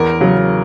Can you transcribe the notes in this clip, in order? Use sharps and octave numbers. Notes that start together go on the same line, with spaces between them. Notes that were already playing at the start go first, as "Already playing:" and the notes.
Already playing: E2 A#4
C#3 F#3